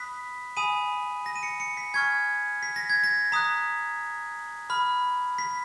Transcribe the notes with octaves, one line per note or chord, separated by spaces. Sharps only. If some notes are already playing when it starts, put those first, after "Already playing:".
Already playing: B5 D#6 F#6 B6
G#5 B5 D#6 D#7
A#6
D#7
C#7
C#7
B6
G#5 C#6 F6 G#6
B6
A#6
G#6
A#6
A#5 D#6 F#6 B6
B5 F6
B6